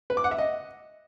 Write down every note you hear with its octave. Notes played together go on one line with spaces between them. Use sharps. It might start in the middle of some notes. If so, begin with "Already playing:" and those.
B4
D6
F#5
E5
D#5